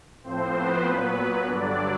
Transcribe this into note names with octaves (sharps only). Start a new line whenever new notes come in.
A2 F3 C4 C5
B3 B4
A#2 F#3
G2 D3 F#3 D4 D5